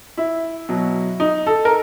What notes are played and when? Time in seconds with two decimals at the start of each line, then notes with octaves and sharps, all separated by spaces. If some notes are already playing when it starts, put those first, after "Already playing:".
0.17 E4
0.69 B2 F#3
1.20 D#4
1.46 A4
1.65 A#4